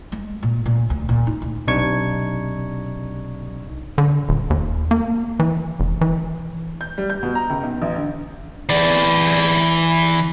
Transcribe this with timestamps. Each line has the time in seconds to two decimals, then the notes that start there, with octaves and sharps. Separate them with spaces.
0.12 G#3
0.43 A#2
0.66 A#2
0.90 D2
1.09 A#2
1.27 D#4
1.42 D2
1.67 B1 C3 D4 D#4 C#6 G#6
3.98 D3
4.29 D#1
4.50 D#2
4.91 A#3
5.39 E3
5.80 F1
6.01 E3
6.81 G6
6.98 G3
7.10 G6
7.23 B2
7.35 A#5
7.50 C#2
7.63 B1
7.82 A1
7.96 D3
8.69 E3 D5